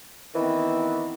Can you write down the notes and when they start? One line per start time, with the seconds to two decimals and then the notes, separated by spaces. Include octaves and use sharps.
0.35 D#3 E3 B3 C4 E4